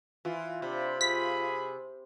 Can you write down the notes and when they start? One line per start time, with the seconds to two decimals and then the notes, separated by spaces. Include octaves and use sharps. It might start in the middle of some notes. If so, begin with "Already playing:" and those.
0.25 E3 F4
0.62 C3 D4 D5 B5
1.01 G#4 B5 B6